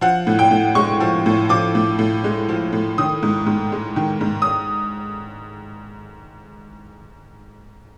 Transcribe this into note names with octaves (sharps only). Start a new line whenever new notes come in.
F3 F#5
A2
G5
A2
G#3 C#6
F3
A2
F3 D6
A2
A2
G#3
F3
A2
D#3 D#6
G#2
G#2
G#3
D#3
G#2
D#6